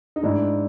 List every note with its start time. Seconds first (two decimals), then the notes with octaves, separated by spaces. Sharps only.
0.16 D#4
0.23 G#2 D4 E4